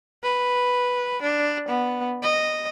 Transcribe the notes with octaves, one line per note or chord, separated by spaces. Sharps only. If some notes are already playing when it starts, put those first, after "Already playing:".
B4
D4
B3
D#5